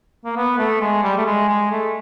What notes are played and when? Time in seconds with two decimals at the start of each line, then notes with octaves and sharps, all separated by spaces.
0.25 A#3
0.36 B3
0.59 A3
0.81 G#3
1.03 G3
1.17 A3
1.26 G#3
1.49 G#3
1.71 A3